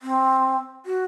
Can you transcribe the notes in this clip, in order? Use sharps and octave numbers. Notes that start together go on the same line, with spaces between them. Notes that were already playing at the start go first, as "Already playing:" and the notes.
C4
F#4